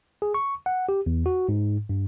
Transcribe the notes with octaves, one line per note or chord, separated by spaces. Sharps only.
G#4
C#6
F#5
G4
E2
F#4
G#2
G2